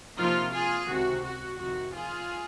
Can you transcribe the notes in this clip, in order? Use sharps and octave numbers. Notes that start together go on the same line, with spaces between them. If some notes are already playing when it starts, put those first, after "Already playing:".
C3 F3 A#3 D#4 F4
F4 G#4
C#2 C3 D#3 F#4
F#4
F2 C3 D#3 F#4
F4 G#4